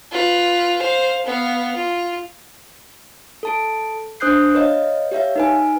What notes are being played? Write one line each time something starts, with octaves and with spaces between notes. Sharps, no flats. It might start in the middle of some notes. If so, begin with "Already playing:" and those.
F4 B4
C5 F5
B3 F5
F4
A4 A5 D7
D4 C5 D#6 F#6 G6 C7
B4 C#5 D#5 F5
G4 C#5 E5 F5
D#4 B4 G#5